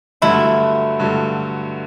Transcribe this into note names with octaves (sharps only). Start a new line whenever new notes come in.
G2 D3 F#3 A3 E4
G2 D3 F#3 A3